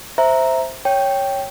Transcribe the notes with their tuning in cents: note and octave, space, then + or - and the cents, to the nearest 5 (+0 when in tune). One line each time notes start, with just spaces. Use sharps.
C5 +0 E5 +0 A#5 +0
C#5 +0 G5 +0